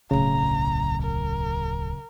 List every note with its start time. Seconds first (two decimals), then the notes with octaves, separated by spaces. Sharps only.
0.11 D1 B1 C#3 A#5
1.03 A#4